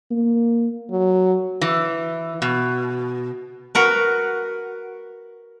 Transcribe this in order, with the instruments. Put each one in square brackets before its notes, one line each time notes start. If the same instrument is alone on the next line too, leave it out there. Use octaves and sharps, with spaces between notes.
[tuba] A#3
[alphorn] F#3
[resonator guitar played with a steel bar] E3
B2
[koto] F#4 A#4 B4